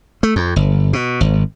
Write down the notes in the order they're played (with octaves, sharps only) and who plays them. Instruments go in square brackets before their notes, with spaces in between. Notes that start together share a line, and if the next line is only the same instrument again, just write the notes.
[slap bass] A3
F2
G1
B2
G#1